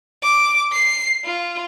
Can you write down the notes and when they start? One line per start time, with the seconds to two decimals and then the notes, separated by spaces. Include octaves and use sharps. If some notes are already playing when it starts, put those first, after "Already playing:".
0.23 D6
0.73 C7
1.25 F4